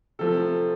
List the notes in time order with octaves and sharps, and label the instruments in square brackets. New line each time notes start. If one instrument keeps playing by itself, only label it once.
[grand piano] C3 F3 A3 A4